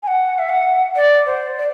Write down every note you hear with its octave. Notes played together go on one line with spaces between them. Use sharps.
G#5
F#5
E5
F#5
D5
C5
D5